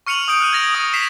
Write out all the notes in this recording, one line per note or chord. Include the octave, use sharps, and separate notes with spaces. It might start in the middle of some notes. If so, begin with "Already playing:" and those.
C#6 F6 C#7 D#7 F7 F#7
D#6 G6 D7
F6 F#6 D#7
G#6 A#6 F7
D#6
B6 C7 E7